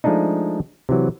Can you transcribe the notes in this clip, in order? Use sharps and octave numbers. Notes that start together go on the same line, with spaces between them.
F3 G#3 A3 D4 D#4
C3 E3 F#3